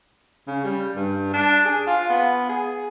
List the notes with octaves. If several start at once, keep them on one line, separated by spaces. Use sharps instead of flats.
C#3
G3
G2
D4
G#4
F4
B3
G#4